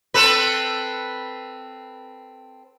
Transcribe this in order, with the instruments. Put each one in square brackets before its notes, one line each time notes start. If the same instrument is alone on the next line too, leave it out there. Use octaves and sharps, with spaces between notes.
[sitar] C4 A4 B4